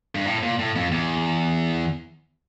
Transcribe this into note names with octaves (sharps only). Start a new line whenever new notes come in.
G2
A2
A#2
A2
F2
E2